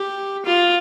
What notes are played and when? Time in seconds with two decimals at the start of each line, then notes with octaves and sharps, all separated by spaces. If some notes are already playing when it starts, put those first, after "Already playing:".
Already playing: G4
0.45 F4